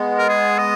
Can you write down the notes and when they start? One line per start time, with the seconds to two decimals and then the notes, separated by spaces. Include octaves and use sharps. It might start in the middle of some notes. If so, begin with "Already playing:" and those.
Already playing: G#3 B3
0.19 A#4
0.29 G#4
0.58 D#5